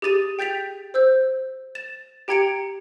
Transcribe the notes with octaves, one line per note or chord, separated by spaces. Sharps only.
G4 G#4 A6 D#7
G5 G6 A6 B6 F7
C5 E6 G6
A6 E7
G4 G5 A#5 G#6 C#7 D7